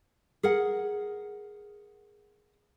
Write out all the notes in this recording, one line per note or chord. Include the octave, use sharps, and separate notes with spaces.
G#4 A#4 F#5